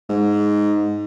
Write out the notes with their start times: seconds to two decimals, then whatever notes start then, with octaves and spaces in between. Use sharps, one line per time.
0.09 G#2